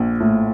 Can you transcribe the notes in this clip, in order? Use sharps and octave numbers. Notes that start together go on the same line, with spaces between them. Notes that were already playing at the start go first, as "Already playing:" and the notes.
Already playing: A#1
A2